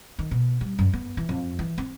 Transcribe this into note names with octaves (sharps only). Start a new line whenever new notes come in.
D#3
B2
G3
F#2
B3
E3
F2
E3
C4